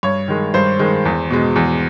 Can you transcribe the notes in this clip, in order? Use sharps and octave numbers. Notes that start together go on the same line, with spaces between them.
G2 C#5
D#3 G#3
G2 C5
D#3 G#3
E2
B2 G#3
E2